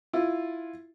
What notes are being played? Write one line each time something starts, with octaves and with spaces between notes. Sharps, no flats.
E4 F4